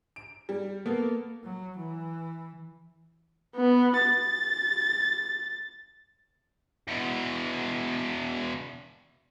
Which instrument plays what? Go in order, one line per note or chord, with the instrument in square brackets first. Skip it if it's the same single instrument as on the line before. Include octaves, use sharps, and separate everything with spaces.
[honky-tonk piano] D7
G3
[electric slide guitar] A#3 [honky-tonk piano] B3 A4
[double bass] F#3
E3
[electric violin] B3
A6
[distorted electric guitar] E2 B2